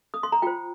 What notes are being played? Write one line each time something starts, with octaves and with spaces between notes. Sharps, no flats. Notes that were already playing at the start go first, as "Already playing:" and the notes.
D#6
C6
A#5
F4 C5 G5